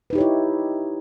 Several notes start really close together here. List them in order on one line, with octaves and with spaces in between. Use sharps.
B4 D#4 G4 C#5 E4